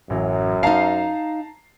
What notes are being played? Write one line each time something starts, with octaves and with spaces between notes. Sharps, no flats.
A1 F#2 F#3
D#4 F5 A5 A#5 C7